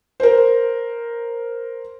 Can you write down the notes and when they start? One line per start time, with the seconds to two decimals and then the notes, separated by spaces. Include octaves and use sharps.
0.20 A#4 C5